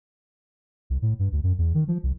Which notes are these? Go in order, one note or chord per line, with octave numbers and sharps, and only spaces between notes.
C2
A2
G2
D2
F#2
E2
D#3
F3
C2